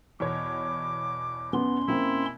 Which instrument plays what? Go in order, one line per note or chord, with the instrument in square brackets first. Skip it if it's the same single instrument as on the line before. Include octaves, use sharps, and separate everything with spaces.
[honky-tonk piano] E2 B2 C#5 [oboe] D6
[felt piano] B3 [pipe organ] C#4 C6
[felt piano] A#3 C4 [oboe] E4